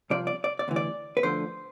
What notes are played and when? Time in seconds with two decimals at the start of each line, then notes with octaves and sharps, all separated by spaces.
0.10 C2 C3 F3 D5
0.27 D5
0.44 D5
0.59 D5
0.68 D2 C3 E3
0.76 D5
1.17 B4
1.23 D2 D3 F3 C5